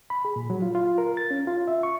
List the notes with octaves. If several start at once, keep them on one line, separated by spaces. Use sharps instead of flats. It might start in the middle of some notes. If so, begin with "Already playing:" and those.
B5
G#4
A#2
F#3
F4
F4
A#4
A6
C#4
F4
E5
C#6